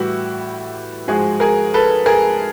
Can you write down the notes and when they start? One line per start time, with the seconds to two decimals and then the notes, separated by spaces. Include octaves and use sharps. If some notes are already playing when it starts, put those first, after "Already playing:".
Already playing: A2 E3 G3 E4 F#4
1.08 G#2 F3 G#3 F#4 G#4
1.40 G#4 A#4
1.74 A4 B4
2.06 G#4 A#4